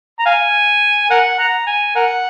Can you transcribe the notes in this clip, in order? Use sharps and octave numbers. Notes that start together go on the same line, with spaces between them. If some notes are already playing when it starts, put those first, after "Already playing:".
A#5
F5 G#5
A#4 F#5
F#5 A#5
G#5
A#4 F#5